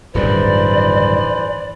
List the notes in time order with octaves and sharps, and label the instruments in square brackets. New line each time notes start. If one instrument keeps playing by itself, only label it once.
[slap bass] D1 G2 D#3 [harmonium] E3 B4 C5 [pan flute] D5